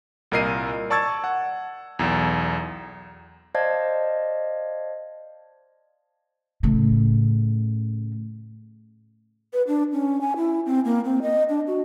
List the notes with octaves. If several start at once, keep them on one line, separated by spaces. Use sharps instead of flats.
C2 A#2 A#4 D#5 C7 D#7
D5 A5 C#6 E6 G#6 A6
F#5
B1 E2
C5 D5 D#5 F5 A5 G#6
A2 C#3
B4
D4
C#4
G#5
E4
C4
A#3
C4
D#5
D4
F#4